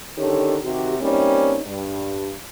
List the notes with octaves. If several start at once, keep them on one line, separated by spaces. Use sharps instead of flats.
D3 D#3 C#4 G4 A4 C#5
C3 D#3 F#4 G4
G3 A#3 C4 C#4 D#4
G2